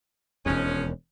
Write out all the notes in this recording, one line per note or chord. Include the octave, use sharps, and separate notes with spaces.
E1 D#2 F3 G#3 C#4